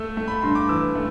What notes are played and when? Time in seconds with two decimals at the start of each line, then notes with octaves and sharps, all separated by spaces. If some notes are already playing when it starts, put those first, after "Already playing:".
Already playing: A3 E6
0.17 A3
0.28 B5
0.42 G2 C6
0.55 D6
0.69 E3 E6
0.95 A3